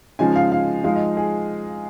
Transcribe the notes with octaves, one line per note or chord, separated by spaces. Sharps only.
C#3 F3 G#3 D#4 G#5
F5
F5
F3 G#3 D#4 F5
D#5
G#4